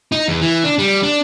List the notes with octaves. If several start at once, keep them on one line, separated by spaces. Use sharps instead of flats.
D#4
E2
E3
D4
G3
D4